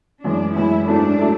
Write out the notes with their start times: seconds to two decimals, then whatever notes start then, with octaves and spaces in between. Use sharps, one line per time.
0.24 F#2 E3 G#3 D4
0.56 F#2 E3 G#3 E4
0.87 G#2 F#3 A3 D4 E4 A4
1.18 F#3 A3 E4 A4